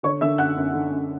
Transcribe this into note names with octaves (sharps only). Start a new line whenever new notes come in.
D3 C#5 C#6
D3 E5 E6
F#2 F#5 F#6
F#2
D3
F#2